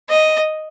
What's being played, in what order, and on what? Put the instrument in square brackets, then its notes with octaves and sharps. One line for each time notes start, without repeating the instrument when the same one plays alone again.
[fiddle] D#5